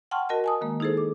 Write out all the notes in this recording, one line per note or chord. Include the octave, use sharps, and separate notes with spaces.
F#5 G5 A5 C6 C#6 F6
F#4 A#4 D#5 A5
G#5 A5 D#6
D#3 G#3 A#3
D#4 E4 G#4 A4 C5
D6